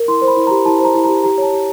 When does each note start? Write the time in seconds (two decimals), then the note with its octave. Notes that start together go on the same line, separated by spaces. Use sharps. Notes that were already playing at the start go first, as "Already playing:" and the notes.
Already playing: A#4
0.08 E4 C6
0.22 C5
0.28 B5
0.37 E4
0.47 G4 A#5
0.65 E4 A5
0.80 C5 A#5
0.95 E4
1.04 G4 A#5
1.23 G4 A#5
1.38 C#5 A5
1.52 G4